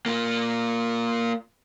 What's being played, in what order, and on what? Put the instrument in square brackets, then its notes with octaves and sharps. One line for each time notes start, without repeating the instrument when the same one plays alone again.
[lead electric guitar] A#3 F4